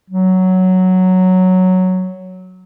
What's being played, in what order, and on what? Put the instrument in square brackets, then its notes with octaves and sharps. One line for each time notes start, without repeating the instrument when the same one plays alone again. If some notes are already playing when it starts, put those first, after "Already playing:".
[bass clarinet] F#3